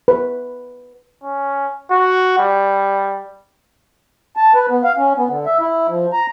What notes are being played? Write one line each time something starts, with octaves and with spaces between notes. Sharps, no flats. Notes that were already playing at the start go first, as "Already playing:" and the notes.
B4
C#4
F#4
G3
A5
B4
B3
F5
C#4
B3
D3
E5
E4
F3
A#5